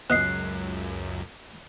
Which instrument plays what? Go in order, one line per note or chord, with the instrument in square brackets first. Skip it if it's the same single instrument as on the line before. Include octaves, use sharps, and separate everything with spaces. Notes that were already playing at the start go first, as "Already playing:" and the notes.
[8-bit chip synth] C#2 F#2 [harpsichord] B3 D#5 [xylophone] F#6 C7